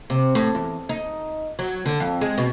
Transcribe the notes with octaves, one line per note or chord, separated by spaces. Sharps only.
C3
A2
E2
D#4
F#3
D3
F2
G#3
B2